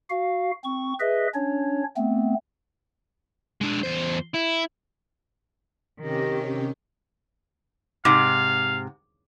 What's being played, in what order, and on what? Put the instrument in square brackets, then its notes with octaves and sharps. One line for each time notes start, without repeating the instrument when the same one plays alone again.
[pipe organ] F#4 F5
C4 C#6
G#4 B4 D#5 E5
C#4 D4 C#5
A3 B3 C4
[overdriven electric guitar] G#3 D4
E2 C5
E4
[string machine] C3 C#4 G4 [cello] D#3
[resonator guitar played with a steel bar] G#2 C3 [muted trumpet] F5 [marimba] D6